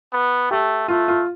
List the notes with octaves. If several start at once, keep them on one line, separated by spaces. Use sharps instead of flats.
B3
A3 G4
A3 F4
F4